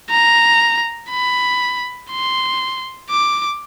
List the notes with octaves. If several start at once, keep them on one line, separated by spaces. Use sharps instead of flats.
A#5
B5
C6
D6